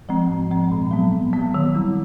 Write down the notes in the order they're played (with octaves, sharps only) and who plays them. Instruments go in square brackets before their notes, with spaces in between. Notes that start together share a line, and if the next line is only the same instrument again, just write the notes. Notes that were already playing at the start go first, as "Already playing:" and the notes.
[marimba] F3 G#3 C4
G#2
F3 G#3 C4
A#2
F#3 B3
A#2
F#3 B3
D#3
G3 C4 E4